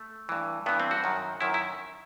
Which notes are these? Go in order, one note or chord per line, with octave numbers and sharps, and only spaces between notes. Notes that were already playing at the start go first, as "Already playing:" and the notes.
Already playing: A3
G2 E3
G2 E3 B3
C4
F#4
F#2 D#3
F#2 D#3 E4
E4